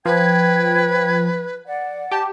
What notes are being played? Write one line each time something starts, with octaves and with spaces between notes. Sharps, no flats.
F3 B4 G5 G#6
D5 F#5
G4 A5